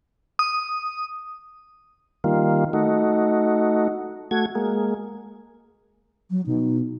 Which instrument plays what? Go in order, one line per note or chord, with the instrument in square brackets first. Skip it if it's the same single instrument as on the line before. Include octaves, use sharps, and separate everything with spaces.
[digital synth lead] D#6
[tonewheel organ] D#3 G3 A#3 F4
A3 D#4 F#4
A3 F#4 G#6
G#3 A#3
[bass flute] F#3
[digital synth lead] B2 [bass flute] D#4